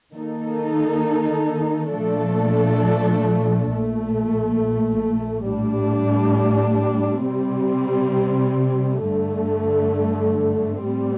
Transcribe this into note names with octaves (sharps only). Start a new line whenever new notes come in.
D#3 A#3 D#4 A4
A#2 F3 A3 D4 A4
A#1 A#2 A3
A2 G3 D4
C3 G3 C4
G2 D3 A3
A2 G3 C4